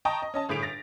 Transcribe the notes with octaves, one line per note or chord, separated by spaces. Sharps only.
D#5 G5 A5 A#5 C#6 D#6
D#5
C#4 D#5 A5
G1 A2 G#4 B6 D7 F7
A6 A#6